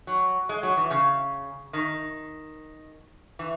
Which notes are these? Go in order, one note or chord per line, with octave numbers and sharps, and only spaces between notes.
F#3
G#3
F#3
E3
C#3
D#3
E3